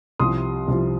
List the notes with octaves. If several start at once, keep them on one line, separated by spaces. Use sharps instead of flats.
C2 C3 F3 C6 D#6
C2 C3 F3